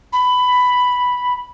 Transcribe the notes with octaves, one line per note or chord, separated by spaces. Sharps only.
B5